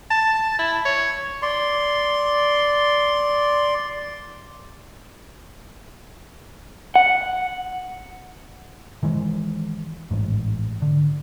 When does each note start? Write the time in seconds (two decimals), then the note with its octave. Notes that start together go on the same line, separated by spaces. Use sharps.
0.11 A5
0.59 E4
0.85 C#5
1.42 D5 C6
6.95 F#5
9.03 D#3 E3 G#3
10.11 A1 G#2
10.82 D3